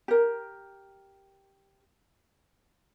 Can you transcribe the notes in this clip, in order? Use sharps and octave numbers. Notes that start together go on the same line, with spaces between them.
G4 A#4